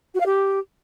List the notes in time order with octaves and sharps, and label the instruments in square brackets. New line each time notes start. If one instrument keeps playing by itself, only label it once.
[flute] F#4
F5
G4